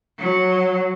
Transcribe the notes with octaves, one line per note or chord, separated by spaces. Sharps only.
F#3